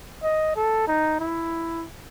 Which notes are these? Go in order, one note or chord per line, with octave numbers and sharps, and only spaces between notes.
D#5
A4
D#4
E4